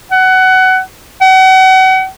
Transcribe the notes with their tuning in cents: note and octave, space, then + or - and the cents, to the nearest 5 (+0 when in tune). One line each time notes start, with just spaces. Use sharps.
F#5 +20
F#5 +35